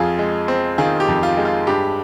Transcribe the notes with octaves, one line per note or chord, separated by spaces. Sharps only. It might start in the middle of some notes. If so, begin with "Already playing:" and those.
Already playing: F2 F4 G#4
G#3
C4
D#3 F4 G#4
G4
F2
F4
G#3
F4
G2 G4